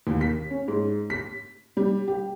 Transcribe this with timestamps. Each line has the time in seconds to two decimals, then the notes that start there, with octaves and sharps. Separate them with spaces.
0.07 D#2
0.21 B6
0.51 C#4
0.68 G#2
1.10 B6
1.77 G3
2.08 G4